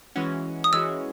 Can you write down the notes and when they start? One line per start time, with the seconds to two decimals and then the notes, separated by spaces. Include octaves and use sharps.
0.16 E3 G#3 C#4 F#4
0.64 D#6
0.73 E3 G#3 C#4 F#4 E6